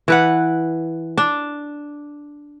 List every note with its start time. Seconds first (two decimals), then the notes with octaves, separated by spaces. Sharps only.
0.08 E3 B4 F#5
1.18 D4